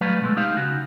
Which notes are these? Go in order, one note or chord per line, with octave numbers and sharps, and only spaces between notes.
F#3 G3 A3 B4 F5
B2 G#3 A3
D#4 G4 F5
C#3 F#4